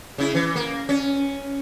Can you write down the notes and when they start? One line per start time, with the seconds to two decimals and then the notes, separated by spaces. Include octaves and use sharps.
0.18 C#3 E4
0.34 E3
0.56 A#3
0.89 C#4